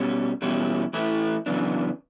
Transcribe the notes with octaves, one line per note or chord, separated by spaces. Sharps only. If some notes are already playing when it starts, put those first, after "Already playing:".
Already playing: B2 G3 C#4
E2 B2 G3 C#4 E4
A2 E3 A3 E4
F#2 C#3 E3 B3 D4